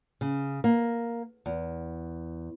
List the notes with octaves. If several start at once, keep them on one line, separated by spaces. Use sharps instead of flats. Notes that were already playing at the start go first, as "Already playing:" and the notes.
C#3
A#3
E2